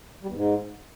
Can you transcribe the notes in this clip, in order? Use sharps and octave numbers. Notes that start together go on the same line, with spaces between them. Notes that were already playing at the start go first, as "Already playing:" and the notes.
G3
E2
G#2